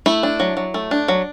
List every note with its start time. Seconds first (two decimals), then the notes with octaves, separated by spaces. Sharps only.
0.06 A3 E4
0.23 D4
0.40 F#3
0.57 F#3
0.74 A3
0.91 D4
1.08 F#3